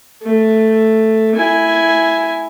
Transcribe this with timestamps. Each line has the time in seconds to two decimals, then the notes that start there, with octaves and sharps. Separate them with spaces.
0.22 A3
1.36 E4 G#5